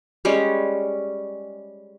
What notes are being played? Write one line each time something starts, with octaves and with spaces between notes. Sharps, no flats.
G3 G#3 C#4